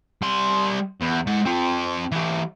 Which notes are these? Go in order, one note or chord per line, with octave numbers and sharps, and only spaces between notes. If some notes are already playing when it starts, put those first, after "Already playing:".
G3 C6
E2
G#3 F#5
C4 F4
E3 G4